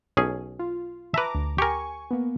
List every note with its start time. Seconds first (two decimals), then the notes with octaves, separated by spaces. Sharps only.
0.17 B1 C#4 G#4
0.59 F4
1.14 B4 E5 A5 A#5 D6
1.35 D2
1.58 G4 A#4 G#5 C#6
2.11 A#3 B3